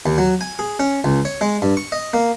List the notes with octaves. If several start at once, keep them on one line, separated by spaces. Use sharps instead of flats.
D#2
F#3
G#5
G#4
C#4
C#2
C#5
G#3
G2
C#6
D#5
A#3